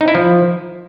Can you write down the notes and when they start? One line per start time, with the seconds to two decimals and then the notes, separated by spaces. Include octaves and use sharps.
0.01 D#4
0.08 E4
0.15 F3